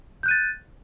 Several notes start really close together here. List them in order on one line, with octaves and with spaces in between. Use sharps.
G6 F#6 D#7 A6